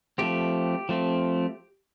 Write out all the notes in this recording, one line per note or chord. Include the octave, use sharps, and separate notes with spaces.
F3 A3 C4 G4
F3 A3 C4